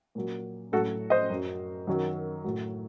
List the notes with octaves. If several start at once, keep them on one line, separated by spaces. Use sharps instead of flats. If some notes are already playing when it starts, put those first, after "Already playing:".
A#2 F#3
A2 F#3 F#4 A4
C5 D#5
F#2 F#3
F#2 D#3 F#3
A2 F#3